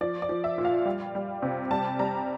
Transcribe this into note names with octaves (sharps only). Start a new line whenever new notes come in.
F3 D5
D5
F3
E5
A#2
F5
G3
G3
C3
G3 A5
G3 A#5